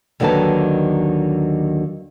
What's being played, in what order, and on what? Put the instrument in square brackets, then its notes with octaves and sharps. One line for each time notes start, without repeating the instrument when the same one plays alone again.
[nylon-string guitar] D#2 D3 D#3 F#3 B4 A5